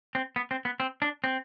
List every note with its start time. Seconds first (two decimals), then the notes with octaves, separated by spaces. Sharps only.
0.15 C4
0.36 B3
0.51 C4
0.65 B3
0.80 C4
1.02 D4
1.24 C4